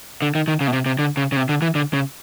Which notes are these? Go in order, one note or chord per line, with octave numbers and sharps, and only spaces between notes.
D3
D#3
D#3
C#3
B2
C3
C3
D3
C#3
C#3
C3
D3
E3
D3
C#3